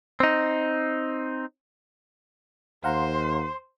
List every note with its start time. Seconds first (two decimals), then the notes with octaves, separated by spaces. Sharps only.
0.20 C4 D#4
2.84 D#2 C5 F5 F#5 A#5 C6